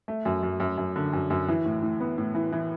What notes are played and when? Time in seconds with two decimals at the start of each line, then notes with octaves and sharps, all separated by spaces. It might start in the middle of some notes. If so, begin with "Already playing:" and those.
0.08 A3
0.25 F#2
0.43 F#2
0.60 F#2
0.78 F#2
0.96 D3
1.13 F#2
1.30 F#2
1.48 E3
1.65 A2
1.82 A2
2.00 B3
2.18 A2
2.35 E3
2.52 E3